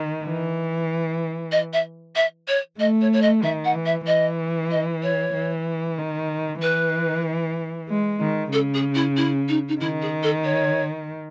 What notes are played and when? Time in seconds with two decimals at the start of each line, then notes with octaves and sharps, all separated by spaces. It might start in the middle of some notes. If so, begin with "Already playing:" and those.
Already playing: D#3
0.24 E3
1.51 D#5
1.73 E5
2.15 E5
2.47 C#5
2.79 A3 D#5
3.01 C#5
3.13 C#5
3.22 D#5
3.43 D#3 E5
3.64 F#5
3.75 E3
3.85 E5
4.06 E3 D#5
4.71 D#5
5.02 C#5
5.34 E3
5.98 D#3
6.61 E3 B4
7.89 G#3
8.21 D#3
8.53 C#3 A4
8.74 G#4
8.95 E4
9.17 E4
9.48 D#4
9.68 D#4
9.80 D#3 E4
10.02 G#4
10.23 A4
10.44 C#5